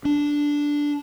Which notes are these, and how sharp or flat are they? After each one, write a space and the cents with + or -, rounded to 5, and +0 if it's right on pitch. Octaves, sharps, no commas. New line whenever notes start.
D4 -5